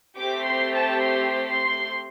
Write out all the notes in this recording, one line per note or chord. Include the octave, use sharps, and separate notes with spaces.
A3 C4 G4 D6
C6
A5
C6
C6